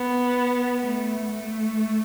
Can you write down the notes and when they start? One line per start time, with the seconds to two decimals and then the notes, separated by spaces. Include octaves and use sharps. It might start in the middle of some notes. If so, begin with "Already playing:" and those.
Already playing: B3
0.84 A3
1.32 A3